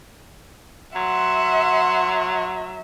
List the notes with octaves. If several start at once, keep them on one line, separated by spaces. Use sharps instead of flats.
F#3 E5 F#5 C6